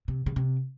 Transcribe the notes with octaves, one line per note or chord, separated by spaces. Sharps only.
C3
C#3
C3